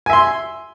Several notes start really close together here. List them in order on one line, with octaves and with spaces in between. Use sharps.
G#5 E5 C6